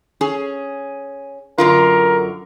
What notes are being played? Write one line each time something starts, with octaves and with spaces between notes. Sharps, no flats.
C#4 G#4
F#2 D3 F4 A#4